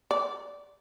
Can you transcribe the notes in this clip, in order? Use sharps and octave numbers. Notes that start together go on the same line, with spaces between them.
D5